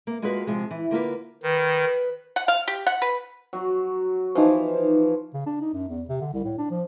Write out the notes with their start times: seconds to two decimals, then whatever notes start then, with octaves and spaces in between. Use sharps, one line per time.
0.07 A#3
0.22 G#3 A#3 F4 F#4 G#4 B4
0.47 C3 F3 G#3
0.71 E3
0.91 D3 A#3 F4 B4
1.43 D#3 B4
2.36 F#5
2.48 F5
2.68 G4
2.87 F#5
3.02 B4
3.53 F#3 F#4
4.35 E3 F3 D#4 C5
5.34 C#3
5.46 D4
5.61 D#4
5.73 F#2
5.88 E2
6.09 C3
6.21 D3
6.33 C2
6.44 A2
6.58 D4
6.70 F3